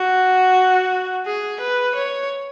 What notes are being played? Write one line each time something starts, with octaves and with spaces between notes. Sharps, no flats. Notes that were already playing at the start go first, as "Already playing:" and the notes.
Already playing: F#4
G#4
B4
C#5